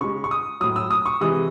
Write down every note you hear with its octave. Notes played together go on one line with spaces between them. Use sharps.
C#3 G#3 C#6
C#6
D#6
A2 F#3 D#6
E6
D#6
C#6
C3 E3 G#3 D#6